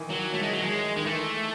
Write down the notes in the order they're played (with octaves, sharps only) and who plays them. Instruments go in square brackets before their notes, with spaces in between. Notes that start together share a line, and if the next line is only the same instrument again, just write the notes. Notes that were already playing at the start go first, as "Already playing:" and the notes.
Already playing: [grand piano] D#3 E3
[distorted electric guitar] F#3
A3
G#3
F#3
G#3
[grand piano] D#3 [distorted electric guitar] G#3
[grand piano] E3 [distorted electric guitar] A3